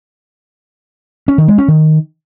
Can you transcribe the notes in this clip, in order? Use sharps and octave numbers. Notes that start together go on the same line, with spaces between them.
C#4
D#3
G#3
C#4
D#3